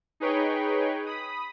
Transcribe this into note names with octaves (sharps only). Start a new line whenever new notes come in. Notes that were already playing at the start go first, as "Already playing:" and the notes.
D#4 G#4 B4 C#5 G5
B5 D#6